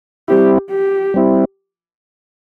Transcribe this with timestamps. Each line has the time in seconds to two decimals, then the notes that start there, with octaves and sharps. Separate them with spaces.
0.28 G3 C4 E4 G4
0.71 G4
1.14 G3 C4 E4